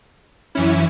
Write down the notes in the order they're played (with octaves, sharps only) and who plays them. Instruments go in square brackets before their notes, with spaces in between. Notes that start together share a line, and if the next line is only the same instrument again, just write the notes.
[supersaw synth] F#2 E3 C#4 E4